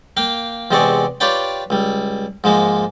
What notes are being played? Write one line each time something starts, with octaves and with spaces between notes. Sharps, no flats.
A#3 F5 G5
E2 C3 G#3 C4 D5 C#6
F4 G4 B4 C#5 D5 G5
C#2 G3
G#2 F3 G#3 A#3